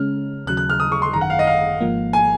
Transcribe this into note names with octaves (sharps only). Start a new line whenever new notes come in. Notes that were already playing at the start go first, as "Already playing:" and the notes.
Already playing: C#3 G#3 C#4 F6
D#2 C#3 F#3 F#6
F#6
F6
D#6
C#6
C6
G#1 F#2 D#3 A#5
F#5
F5
D#5
F5
G#1 G#2 F3 A#3
G#5